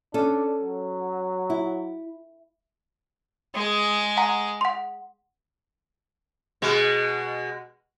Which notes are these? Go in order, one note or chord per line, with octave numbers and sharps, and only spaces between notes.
C#4 D4 A4
F#3
E4
G#3 G#4
F#5 G#5 A#5
F#5 C6
B2 G#3